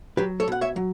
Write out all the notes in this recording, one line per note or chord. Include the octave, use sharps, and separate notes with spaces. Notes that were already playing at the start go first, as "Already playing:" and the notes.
F#3 G4 B4
A4 C#5
B2 F#5
C#5 E5
F#3